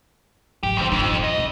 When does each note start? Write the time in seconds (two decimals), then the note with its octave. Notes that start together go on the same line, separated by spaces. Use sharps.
0.63 G#2 F#3 G4
0.77 F2 G#3 C4 C#4
0.92 D#1 F2 D#4
1.24 D#5
1.38 D#2 G3